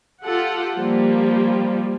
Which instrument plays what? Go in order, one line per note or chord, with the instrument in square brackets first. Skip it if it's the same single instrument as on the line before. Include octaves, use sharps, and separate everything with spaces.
[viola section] F4 G4 A4 F#5
F3 G3 A#3